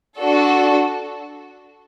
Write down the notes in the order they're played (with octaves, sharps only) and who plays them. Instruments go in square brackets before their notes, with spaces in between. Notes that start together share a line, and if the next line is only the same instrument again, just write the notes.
[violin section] D4 F#4 A4